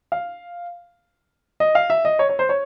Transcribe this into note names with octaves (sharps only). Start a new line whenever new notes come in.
F5
D#5
F5
E5
D#5
C#5
C#5
C5
C#5